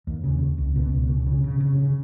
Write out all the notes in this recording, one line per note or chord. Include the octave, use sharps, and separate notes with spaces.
D#2
C#3
C#3
C#2
B2
C#2
C#3
C#3
C#3
C#3
C#3